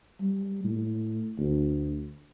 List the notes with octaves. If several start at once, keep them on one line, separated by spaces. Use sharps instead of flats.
G3
A2
D2